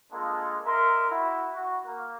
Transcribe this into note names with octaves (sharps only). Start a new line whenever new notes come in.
G#3 A#3 D4 F4 G#4 A4
D#4 A#4 E5 C6
E4 F#4
F#4
A#3